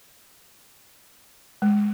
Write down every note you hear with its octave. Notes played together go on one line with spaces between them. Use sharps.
G#3